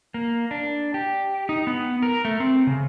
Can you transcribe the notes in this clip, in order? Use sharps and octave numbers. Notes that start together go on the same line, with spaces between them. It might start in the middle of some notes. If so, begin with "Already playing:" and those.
A#3
D4
G4
D#4
B3
A#4
A3
C4
C#3